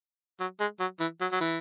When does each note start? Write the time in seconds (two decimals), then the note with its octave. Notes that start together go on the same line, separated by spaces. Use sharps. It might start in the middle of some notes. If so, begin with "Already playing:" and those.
0.40 F#3
0.60 G#3
0.80 F#3
1.00 E3
1.21 F#3
1.32 F#3
1.40 E3